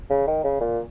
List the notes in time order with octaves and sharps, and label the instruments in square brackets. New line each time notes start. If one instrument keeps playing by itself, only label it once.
[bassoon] C#3
D#3
C#3
A#2